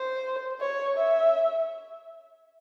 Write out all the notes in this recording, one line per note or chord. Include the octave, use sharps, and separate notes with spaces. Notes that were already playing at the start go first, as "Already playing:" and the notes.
Already playing: C5
C#5
E5